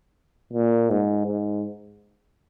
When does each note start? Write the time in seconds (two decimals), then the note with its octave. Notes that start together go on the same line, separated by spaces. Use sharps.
0.53 A#2
0.90 G#2
1.27 G#2